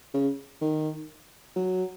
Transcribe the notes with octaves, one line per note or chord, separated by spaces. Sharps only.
C#3
D#3
F#3